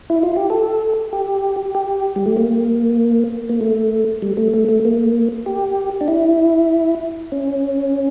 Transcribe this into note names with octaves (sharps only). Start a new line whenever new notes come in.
E4
F4
G4
A4
G4
G4
G3
A3
A#3
A#3
A3
G3
A3
A3
A3
A#3
G4
D4
E4
C#4